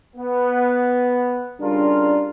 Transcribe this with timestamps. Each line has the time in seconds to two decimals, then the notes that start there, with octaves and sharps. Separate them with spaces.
0.16 B3
1.60 C#3 G3 D4 F4 A#4